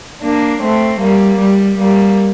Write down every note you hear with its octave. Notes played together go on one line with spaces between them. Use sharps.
A#3 D4
A3 C4
G3 A#3
G3
G3 A#3